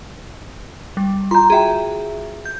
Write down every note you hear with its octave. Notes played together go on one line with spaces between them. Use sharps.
G3
F4 A#5 C6 G6
F4 F#4 G#4 E5 G5
G6